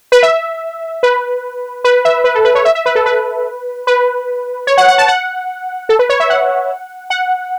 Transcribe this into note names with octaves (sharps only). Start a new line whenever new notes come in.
B4
E5
B4
B4
E5
B4
A4
B4
C#5
E5
E5
B4
A4
B4
B4
C#5
F#5
F#5
A5
F#5
A4
B4
C#5
E5
F#5
F#5